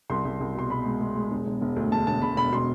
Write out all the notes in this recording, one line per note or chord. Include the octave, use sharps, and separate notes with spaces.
C2 C6
C2
C2
B2 C6
B2 B5
G#3
G#3
G#3
E1
E1
E1
D2
E1 A5
E1 A5
E1 B5
E1 B5
B2 C6